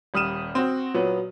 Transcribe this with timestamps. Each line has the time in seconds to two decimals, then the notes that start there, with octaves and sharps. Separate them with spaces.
0.14 D#1 G3 D#6 F6 D#7 E7
0.55 C4 F#4
0.94 A#2 F#3 B3